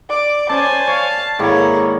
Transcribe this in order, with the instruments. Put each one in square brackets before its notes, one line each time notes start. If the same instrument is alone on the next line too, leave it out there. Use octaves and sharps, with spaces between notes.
[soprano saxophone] D5 [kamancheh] D6
[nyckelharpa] C#4 [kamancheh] C5 G#5 [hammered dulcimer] D5 [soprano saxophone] A5
[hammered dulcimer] C#5 [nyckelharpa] F5
[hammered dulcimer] G#2 D#3 A#3 [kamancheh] E4 A4 [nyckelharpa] G#4 C#5